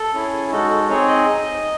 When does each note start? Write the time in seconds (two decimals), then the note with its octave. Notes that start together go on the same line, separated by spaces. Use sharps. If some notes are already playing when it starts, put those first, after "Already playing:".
Already playing: A4
0.14 C#4 E4 G#4
0.51 G#3 D#4 F#4 A4
0.70 A4
0.89 C4 D#4 G#4 C#5
1.08 D#5